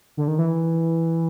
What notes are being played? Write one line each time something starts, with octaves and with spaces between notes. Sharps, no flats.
D3
D#3
E3